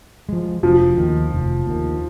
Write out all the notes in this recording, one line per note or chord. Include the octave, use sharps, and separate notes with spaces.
F3 G#3
F1 F3
D#2 D#3
F1
D#2 D#3